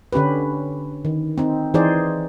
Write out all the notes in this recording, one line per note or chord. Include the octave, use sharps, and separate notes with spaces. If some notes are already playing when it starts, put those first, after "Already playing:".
D3 C#4 G4 B4
D#3
C4 D#4
E3 D#4 G#4 C5 D5